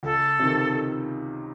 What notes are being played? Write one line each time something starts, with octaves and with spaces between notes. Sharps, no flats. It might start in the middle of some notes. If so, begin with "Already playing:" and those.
C#2 A4
C3 D#3